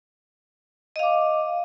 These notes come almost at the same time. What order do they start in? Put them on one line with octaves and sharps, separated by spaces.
D#5 F5 D6